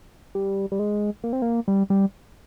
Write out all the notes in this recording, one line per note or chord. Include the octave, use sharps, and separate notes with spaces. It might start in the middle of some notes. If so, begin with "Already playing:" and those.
G3
G3
G#3
A#3
C4
A#3
G3
G3